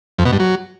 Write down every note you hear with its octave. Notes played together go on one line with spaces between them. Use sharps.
F2
B2
G2
F#3